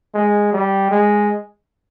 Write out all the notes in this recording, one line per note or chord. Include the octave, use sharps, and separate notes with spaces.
G#3
G3
G#3